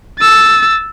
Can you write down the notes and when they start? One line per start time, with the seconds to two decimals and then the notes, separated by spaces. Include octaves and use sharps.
0.19 E6 A6